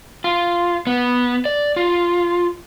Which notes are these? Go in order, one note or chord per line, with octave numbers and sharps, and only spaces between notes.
F4
B3
D5
F4